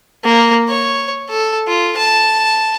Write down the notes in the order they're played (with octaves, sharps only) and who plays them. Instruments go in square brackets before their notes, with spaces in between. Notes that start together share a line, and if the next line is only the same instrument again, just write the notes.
[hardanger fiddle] A#3
C#5
A4
F4
A5